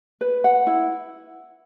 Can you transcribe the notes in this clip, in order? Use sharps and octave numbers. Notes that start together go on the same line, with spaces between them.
B4
F#5
E4